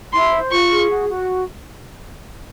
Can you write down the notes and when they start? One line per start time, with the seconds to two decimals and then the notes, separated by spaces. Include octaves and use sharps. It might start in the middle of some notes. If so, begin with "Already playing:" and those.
0.13 E4 C6
0.32 C5
0.51 F4 C#6
0.71 G#4
0.89 F#4
1.09 F#4